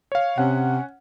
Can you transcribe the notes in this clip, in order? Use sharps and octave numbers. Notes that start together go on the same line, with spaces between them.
C#5 F5
C3 C#4 F#5